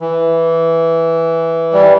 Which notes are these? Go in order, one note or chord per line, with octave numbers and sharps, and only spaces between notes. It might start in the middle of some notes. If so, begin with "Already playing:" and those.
E3
G3